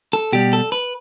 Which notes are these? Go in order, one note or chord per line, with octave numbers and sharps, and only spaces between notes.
A4
B2 G3 G4
A4
B4